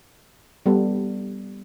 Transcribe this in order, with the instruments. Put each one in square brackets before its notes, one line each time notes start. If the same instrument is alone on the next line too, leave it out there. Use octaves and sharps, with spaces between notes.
[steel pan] G3 B3 G4 A4